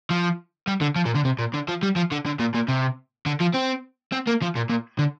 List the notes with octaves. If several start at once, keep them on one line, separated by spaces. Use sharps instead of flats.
F3
G3
D3
F3
A#2
D3
C3
A#2
D3
F3
G3
F3
D3
D3
A#2
A#2
C3
D3
F3
C4
C4
A#3
F3
A#2
A#2
D3